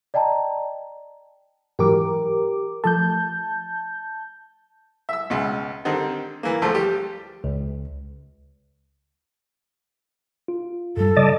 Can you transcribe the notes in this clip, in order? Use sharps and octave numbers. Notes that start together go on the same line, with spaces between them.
D5 D#5 G5 A5 A#5
G#2 E3 F#3 G4 A#4 D6
F3 A3 A5 G6
E5 E6
C#2 B2
D3 D#3 G3 C4
E3 A#3
D2 F3 A3
G3 G4
C#2
F4
G2 G3 A4
C#3 G3 D5 D#5 A5